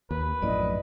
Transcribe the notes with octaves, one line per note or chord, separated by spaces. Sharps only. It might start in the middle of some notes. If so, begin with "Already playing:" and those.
D#2 B4
A#1 F#2 A2 D5 D#5